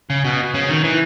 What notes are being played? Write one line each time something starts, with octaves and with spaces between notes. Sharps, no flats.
C#3
B2
C#3
D#3
E3